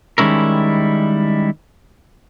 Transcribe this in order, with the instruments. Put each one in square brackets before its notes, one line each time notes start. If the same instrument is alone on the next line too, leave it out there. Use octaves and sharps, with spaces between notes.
[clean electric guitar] D#3 G3 G#3 C#4 E4 A#4